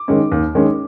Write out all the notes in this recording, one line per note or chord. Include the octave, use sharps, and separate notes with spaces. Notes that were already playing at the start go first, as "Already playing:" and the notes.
Already playing: D6
D#3 G#3 C#4
D#2
D#3 G#3 C#4